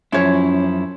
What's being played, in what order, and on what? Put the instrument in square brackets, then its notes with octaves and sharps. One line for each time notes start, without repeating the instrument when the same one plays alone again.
[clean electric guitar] F#2 F3 E4 [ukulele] C#4 C#5